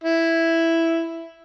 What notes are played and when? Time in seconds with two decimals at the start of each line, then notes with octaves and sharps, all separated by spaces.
0.04 E4